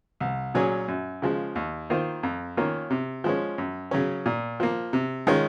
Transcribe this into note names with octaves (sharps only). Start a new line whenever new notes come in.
C2
A#2 F#3 C#4 G#4
F#2
C#3 F3 G#3
D#2
D#3 A#3 F4 C5
F2
D#3 A#3 C#4 F4
C3
F3 G#3 C#4
F#2
C#3 F#3 C#4
A#2
F3 A#3
C3
D#3 G#3 C#4 F4